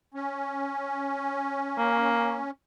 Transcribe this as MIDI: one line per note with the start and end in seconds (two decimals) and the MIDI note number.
0.14 2.51 61
1.78 2.41 58